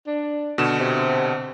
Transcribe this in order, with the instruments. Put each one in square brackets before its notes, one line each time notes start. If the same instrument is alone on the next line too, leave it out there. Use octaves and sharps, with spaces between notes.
[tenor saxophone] D4
[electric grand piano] B2 D3 E7
[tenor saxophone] C3